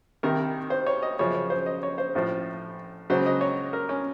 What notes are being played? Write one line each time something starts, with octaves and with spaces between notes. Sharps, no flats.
C2 C3 D#3 A#4
C5
C#5
D#5
F#2 C#3 F3 C#5
C#5
C5
D#5
C#5
C5
A1 A2 F3
C#2 C#3 F#3 C5
D#5
C#5
A#4
C#4